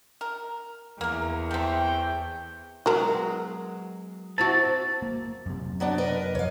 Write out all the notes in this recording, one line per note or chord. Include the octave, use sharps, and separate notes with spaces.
A#4
E2 A#3 A#4
A3 C4 G5
F#3 G#3 B3 F#4 A#4
C4 E4 F#4 A5
A#3
F#2 C3
F#3 B3 D4
A#4 B4 D#5
F1 F2 C#5 F5